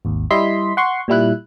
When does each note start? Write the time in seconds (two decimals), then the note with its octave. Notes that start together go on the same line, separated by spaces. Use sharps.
0.05 G#1 D#2
0.30 G3 E4 D#5 C6 B6
0.77 F#5 C6 C#6
1.08 A#2 G3 E4 F#6